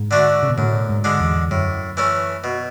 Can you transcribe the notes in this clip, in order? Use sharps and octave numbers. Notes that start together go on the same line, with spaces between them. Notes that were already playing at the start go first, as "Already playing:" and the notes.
Already playing: G#2
D3 A3 D4 F#4
C#3
B2
F#2 A2
G#2
D3 G#3 D4
E2
F#2 A2
E3 A3 C#4
B2